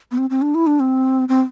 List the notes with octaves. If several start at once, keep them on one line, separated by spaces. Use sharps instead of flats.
B3
C4
C4
D4
E4
D4
C4
C4